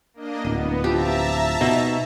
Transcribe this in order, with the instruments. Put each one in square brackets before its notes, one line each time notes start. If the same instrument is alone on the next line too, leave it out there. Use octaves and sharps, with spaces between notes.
[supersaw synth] A#3 D4 D#5
[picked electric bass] D1 [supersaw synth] B3 [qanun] D#5
[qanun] F3 G4 [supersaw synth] E5 A5 A#5
[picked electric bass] B2 [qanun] D#4